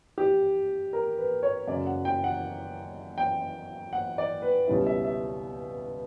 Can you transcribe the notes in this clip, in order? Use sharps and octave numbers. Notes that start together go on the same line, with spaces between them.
G4
A#4
B4
C#5
F#2 C#3 F#3 D5
F#5
G5
F#5
G5
F#5
D5
B4
C#2 B2 G3 C#4 E4
E5
E5